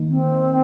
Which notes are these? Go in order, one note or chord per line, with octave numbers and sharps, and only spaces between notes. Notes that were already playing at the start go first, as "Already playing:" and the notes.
Already playing: D#3 A#3 D#4
C4